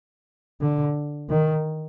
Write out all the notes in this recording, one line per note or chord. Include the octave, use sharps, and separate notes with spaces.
D3
D#3